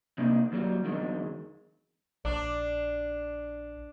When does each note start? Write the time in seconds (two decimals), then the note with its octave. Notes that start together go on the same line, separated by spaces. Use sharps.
0.18 C3 A#3 D4 D#4
0.52 D#2 F#3 G3
0.85 E2 D3 D#3 F#3 G#3
2.25 A#1 D4